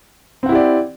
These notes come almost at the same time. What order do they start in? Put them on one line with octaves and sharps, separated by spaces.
C4 F#5 E4 G4 D5